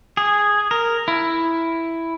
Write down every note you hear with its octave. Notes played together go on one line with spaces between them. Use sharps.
G#4
A#4
E4